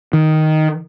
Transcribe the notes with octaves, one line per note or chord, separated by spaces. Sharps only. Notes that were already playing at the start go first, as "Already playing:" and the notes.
D#3